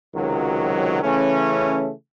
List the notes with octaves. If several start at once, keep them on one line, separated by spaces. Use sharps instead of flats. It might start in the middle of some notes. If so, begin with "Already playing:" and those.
C#2 C3 D#3 F#3
C#3 E3 A3 C#4